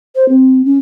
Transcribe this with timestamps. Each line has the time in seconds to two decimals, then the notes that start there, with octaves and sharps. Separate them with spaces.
0.15 C5
0.29 C4
0.65 C#4